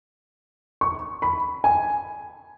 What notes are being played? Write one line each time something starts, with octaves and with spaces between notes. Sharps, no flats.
C#6
B5
G#5